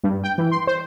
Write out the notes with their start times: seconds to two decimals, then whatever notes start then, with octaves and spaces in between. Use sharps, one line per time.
0.04 G2
0.24 G5
0.38 E3
0.51 C6
0.67 C5